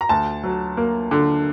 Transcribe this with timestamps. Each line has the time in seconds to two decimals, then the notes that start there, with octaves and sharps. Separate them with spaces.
0.01 A#5
0.09 D2 A5
0.44 F#3
0.77 A#3
1.11 D3